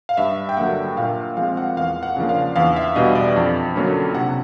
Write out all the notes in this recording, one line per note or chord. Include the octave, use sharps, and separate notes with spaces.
F5
G2 E5
G5
D3 F#3 A#3 F#5
A#2 F5
F3 G#3 C4 F5
F#5
E2 F5
F#5
C#3 F3 A#3 D4
F5
E2 F5
E5
B2 G3 B3 D4 D#5
D5
F2
D3 F#3 A#3 C#4
C3 F#5